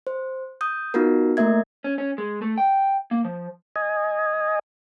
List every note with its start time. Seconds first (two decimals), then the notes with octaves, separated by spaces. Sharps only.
0.07 C5
0.61 D#6 G6
0.94 B3 D#4 F4 F#4 A#4
1.37 A3 A#3 A#4 E5 G#6
1.84 C#4
1.98 C#4
2.18 G#3
2.42 A3
2.58 G5
3.11 A#3
3.25 F3
3.76 D#5 G#5